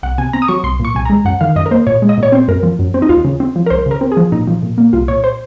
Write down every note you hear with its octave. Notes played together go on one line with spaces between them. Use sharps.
C2 F#5
C3 G#5
C4 A#5
D#6
F#3 C#6
C2 C6
A#2 C#6
C2 G#5
G#3 A#5
F#2 F#5
D#3 F5
F#2 D#5
A#4
A#3 C5
A#2 C#5
G#3
D#5
A#2 C#5
C4 C5
F#2 A#4
F3
F#2
C4
D#4
D#2 F4
C#3
C4
F3
A#4
C#2 C5
C#3 A#4
C4
G#4
F3
A#2 D#4
F3
A#2
A#3
C2 F4
A#2 C#5
C5